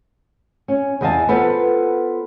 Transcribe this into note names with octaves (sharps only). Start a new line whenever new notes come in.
C#4
E2 E3 D#5 F5 G#5 A5
B3 F4 A4 B4 C5